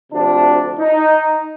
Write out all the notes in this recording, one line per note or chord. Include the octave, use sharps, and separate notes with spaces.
D2 C3 F3 D4
D#4